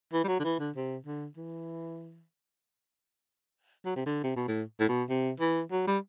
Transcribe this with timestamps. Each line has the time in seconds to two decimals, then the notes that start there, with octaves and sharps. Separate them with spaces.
0.13 E3
0.24 G3
0.28 F#3
0.40 D3
0.44 E3
0.60 D3
0.76 C3
1.06 D3
1.37 E3
3.85 F#3
3.96 C3
4.06 D3
4.24 C3
4.36 B2
4.48 A2
4.80 A2
4.89 B2
5.09 C3
5.40 E3
5.72 F#3
5.87 G3